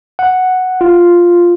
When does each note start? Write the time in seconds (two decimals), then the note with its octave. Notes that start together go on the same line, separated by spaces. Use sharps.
0.19 F#5
0.81 F4